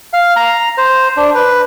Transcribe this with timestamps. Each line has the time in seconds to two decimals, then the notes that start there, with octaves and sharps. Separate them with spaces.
0.13 F5
0.36 A#5
0.77 C5
1.17 D4
1.35 B4